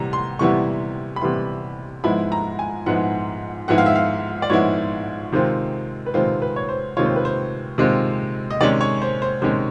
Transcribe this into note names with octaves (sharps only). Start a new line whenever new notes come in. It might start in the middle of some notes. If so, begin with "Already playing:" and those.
Already playing: C3 E3 G3 A#5
C6
C3 E3 G3 B3 E4 C#6
B5
C3 E3 G3 B3 E4 C6
G#2 F3 G#3 B3 E4 B5
A#5
G#5
G#2 F3 G#3 B3 E4 F#5
G#2 F3 G#3 B3 E4 F#5
F5
E5
F5
D5
G#2 F3 G#3 B3 E4 C#5
C3 D#3 G#3 C4 F4 C5
B4
C3 D#3 G#3 C4 F4 C5
B4
C#5
C5
C3 D#3 G#3 C4 F4 C#5
C5
B4
C5
C3 D#3 G#3 C4 F4
D#5
C3 D#3 G#3 C#4 D5
C#5
C5
C5
C3 D#3 G#3 C#4 C5